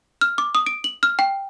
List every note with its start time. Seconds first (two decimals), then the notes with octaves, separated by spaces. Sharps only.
0.21 F6
0.38 D6
0.55 D#6
0.66 D7
0.84 F#7
1.03 F6
1.19 G5